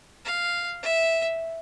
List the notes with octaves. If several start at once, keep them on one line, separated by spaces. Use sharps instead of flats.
F5
E5